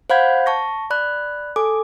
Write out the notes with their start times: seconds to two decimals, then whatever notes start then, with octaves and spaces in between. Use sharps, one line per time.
0.10 C5 F5 F#5 B5 G6 G#6
0.46 A5 C#6 A#6
0.90 D5 B5 F#6
1.56 A4 G#5 D6